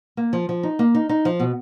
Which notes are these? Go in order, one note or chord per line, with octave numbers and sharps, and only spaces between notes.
A#3
F3
F3
D#4
A#3
D#4
D#4
F3
B2